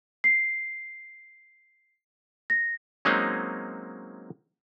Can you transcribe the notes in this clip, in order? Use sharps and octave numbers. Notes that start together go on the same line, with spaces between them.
C7
A#6
F#3 G#3 A#3 C4 C#4 D#4